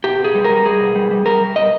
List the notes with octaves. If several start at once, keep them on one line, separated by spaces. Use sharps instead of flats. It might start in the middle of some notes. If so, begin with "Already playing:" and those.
B2 G4
B2
G#4
G3
A#4
G3
G3 G#4
B2
G3
G3
G3 A#4
G3
B2 D#5